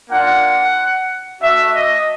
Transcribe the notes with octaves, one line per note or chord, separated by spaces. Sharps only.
A#3 D4 F4 F#5
A3 D4 F#4 E5
D#5